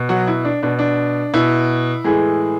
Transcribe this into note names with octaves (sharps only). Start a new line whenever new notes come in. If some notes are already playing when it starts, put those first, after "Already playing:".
Already playing: B2
F#3 F#4
E4
D4
B2 D4
D4
B2 E4
A2 E3 G#3 G#4